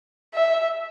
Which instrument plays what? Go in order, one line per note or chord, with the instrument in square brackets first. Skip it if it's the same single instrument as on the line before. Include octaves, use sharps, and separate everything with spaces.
[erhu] E5